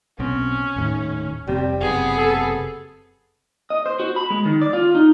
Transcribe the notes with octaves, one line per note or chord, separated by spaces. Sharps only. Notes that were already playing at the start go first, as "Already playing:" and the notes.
B1 B2 C4 C#4
D#1 A2 D#3
F1 C3 G3 C4
F#1 C3 B3 G#4
A4
D#5
C5
F#4
B5
G#3
D#3
D5
F4
D#4